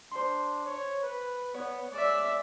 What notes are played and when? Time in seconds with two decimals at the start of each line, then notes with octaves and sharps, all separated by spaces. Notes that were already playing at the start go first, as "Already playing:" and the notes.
0.11 D4 C5 C6
0.65 C#5
1.03 B4
1.54 B3 C#5
1.92 G#3 D5 E5